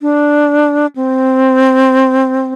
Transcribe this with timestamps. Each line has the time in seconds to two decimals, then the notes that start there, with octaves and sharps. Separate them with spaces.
0.02 D4
0.96 C4